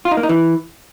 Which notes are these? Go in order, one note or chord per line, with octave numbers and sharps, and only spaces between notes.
F4
D#4
A#3
D#4
E3